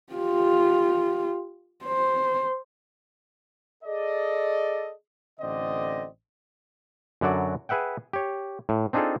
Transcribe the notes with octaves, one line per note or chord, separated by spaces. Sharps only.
F4 G4
C5
G#4 A4 D5 D#5
A1 D3 C4 D5 D#5
F#2 D3 F#3 F#4 D5
G#4 B4 E5 F#5 G5
G4 C#5
A2
C4 D4 D#4 F4 G#4 A4